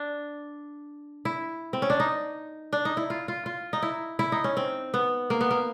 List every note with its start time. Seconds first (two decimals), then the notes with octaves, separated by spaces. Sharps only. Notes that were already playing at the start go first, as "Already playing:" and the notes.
Already playing: D4
1.25 E4
1.73 C4
1.82 C#4
1.90 D4
2.00 D#4
2.73 D4
2.85 D#4
2.97 E4
3.10 F4
3.28 F4
3.46 F4
3.73 D#4
3.82 E4
4.19 E4
4.32 D#4
4.44 C#4
4.57 C4
4.94 B3
5.30 A#3
5.41 B3
5.51 A#3